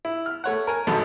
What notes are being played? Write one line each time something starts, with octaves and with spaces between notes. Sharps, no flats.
E4
F6
A3 C#5 F#5
A#4 G#5
G#1 F#2 B2 A4 B5